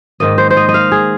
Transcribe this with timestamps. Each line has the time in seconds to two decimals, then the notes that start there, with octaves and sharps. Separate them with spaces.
0.20 G#2 D#3 A#3 D#5
0.38 C5
0.50 C5
0.57 D#5
0.68 D#5
0.74 F5
0.92 G#4